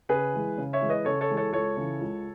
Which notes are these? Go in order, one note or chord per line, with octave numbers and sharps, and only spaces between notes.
C#3 G#4 B4
E3 G#3
C#3
C#5 E5
E3 G#3
B4 D#5
C#3 A4 C#5
A4 C#5
E3 G#3
A4 C#5
C#2 A4 C#5
C#3 E3
C#2